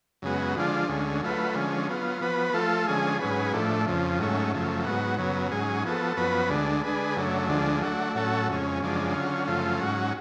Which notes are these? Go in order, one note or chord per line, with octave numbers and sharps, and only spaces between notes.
F#2 C#3 G#3 B3 F#4
D3 F3 G#3 D4 F4
D2 D3 G#3 C#4
F#3 A3 F4 B4
D3 F3 G#3 C#4
F#3 B3 F4
F3 B3 F#4 B4
F3 A3 F4 A4
D3 F3 G#3 C#4 G#4
G#2 F#3 C#4 G#4 B4
A2 F3 A3 D4
F2 C#3 F3
G#2 F#3 A3 C#4
F#2 C#3 F3 A3
G#2 F#3 B3 F#4
F#2 C#3 F#3 B3
G#2 F#3 C#4 G#4
F3 B3 F#4 A4
F#2 F3 B3 F#4 B4
D2 D3 G#3 D4
D3 G#3 D4 G#4 B4
F#2 C#3 F#3 A3 D4
D2 D3 F3 G#3 D4
F#3 A3 D4 F#4
A2 F#3 C#4 F#4 A4
F2 C#3 G#3 C#4
F#2 C#3 F3 G#3 D4
D3 F#3 C#4 F4
F#2 C#3 F3 A3 F4
G#2 F#3 C#4 F#4